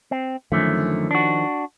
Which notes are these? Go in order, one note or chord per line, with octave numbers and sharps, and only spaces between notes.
C4
F#2 D3 D#3 F3 A3 C#4
D4 F#4